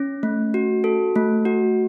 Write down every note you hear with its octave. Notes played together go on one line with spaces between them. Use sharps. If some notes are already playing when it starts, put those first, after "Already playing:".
Already playing: C#4
A3
F#4
A4
A3
F#4